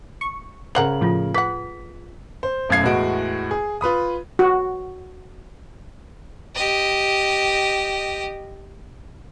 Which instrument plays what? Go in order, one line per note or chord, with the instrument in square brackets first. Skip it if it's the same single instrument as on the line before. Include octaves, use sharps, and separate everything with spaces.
[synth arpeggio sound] C#6
[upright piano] C#3 A#4 F#7 [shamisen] C5 F#5 A#5
[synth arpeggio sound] A2 F3 [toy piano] F4 A4
[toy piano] G#4 [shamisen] B4 F#5 [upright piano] B6
[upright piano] C5
E1 F#2 A3 F5 G#6 C7
E2 A2 G#3 F#4 D7
G#4
F4 B4 B5 D#6
[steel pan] F#4
[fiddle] G4 D#5